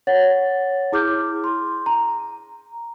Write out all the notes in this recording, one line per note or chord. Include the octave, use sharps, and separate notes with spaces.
C#5 F#5 A6
E4 G#4 D6 F6 G6
C6
A#5